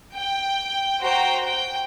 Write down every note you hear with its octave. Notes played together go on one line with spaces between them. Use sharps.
G5
F#4 C5 G5 A#5
G5